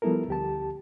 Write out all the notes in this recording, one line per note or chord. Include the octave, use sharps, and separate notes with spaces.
F3 G3 B3 E4 A4 A#4
D2 G4 A5